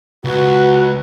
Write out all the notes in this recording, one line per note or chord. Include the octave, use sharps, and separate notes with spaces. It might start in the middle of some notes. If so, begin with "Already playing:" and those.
C#2 F#4 B4